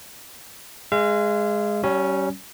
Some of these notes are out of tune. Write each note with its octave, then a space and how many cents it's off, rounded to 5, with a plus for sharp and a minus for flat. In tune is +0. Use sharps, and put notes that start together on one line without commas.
G#3 +0 F5 -40
G3 -35 C#4 +0